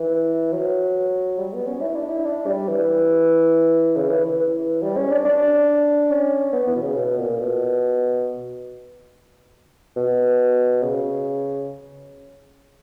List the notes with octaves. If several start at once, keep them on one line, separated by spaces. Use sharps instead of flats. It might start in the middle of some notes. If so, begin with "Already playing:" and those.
Already playing: E3
F#3
G3
B3
C#4
E4
D4
E4
D4
G3
E3
C#3
E3
E3
G3
C#4
D4
D4
C#4
B3
E3
B2
C#3
B2
A#2
B2
B2
C#3